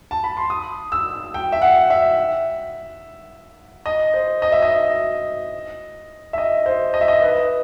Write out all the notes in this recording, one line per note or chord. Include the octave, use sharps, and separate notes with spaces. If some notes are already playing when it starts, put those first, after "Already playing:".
A5
B5
C6
D#6
E6
G5
E5
F#5
E5
D#5
C5
D#5
E5
D#5
E5
D#5
C5
D#5
E5
D#5
B4